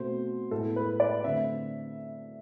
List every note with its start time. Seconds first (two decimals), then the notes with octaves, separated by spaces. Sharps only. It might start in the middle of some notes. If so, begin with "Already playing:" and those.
Already playing: B2 A3 C4 C5
0.51 A2 G#3 B3 A4
0.76 B4
1.00 D5
1.24 D3 A3 C4 E5